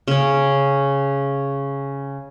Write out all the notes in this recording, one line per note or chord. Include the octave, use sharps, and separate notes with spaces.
C#3 C#4